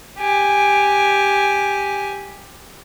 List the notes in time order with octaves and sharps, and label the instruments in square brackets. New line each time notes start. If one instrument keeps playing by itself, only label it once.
[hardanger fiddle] G4 G#5